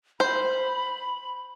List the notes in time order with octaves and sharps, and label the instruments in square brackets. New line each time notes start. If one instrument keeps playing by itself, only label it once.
[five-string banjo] C5 [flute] B5